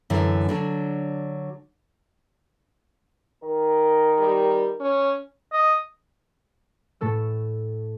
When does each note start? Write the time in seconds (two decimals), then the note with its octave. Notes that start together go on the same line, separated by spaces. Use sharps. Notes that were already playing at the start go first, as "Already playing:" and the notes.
0.10 F#2 D3 E3
0.49 D3 F#3 D4
3.43 D#3 A#4
4.19 G3
4.80 C#4
5.53 D#5
7.01 A2 A3 A4 E6